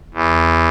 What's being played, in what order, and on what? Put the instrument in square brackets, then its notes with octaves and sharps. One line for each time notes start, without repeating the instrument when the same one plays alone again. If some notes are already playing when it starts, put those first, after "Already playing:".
[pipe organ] E2